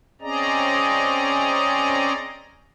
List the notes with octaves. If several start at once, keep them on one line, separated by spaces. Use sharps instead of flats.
C4 C#4 G#4 D5 D#5 A#5